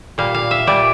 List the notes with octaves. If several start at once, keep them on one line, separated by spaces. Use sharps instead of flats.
A#2 G3 F5
F5
E5
A#2 G3 D5